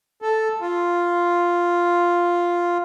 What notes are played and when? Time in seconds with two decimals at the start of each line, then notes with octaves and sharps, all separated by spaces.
0.22 A4
0.61 F4